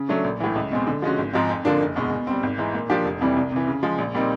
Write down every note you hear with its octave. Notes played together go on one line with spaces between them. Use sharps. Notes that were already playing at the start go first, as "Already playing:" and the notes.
Already playing: C#3
F#3 A3 D4
A#1
A2 E3
C#2
B2 G#3 C4
D3
F3 G#3 C#4 F#4
G#1
G#2 F3 G#3 C4
F2
D3 F3 A#3 D4
F#1
E2 B2 G#3
B2
G3 C4
G#1
G#2 E3
A#2
F3 A#3 D4 G4
F1
F2 C3 E3 G3
C2
C3 E3
C#3
F3 G#3
A#1
A#2 G3 C4 D#4